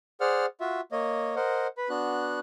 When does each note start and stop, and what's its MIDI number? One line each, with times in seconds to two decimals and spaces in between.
0.21 0.46 68
0.21 0.46 72
0.21 0.46 74
0.21 0.46 78
0.21 0.46 89
0.60 0.81 65
0.60 0.81 66
0.60 0.81 76
0.92 1.35 58
0.92 1.35 73
0.92 1.35 75
1.36 1.67 70
1.36 1.67 72
1.36 1.67 75
1.36 1.67 78
1.77 1.89 71
1.77 1.89 83
1.89 2.40 59
1.89 2.40 62
1.89 2.40 66
1.89 2.40 90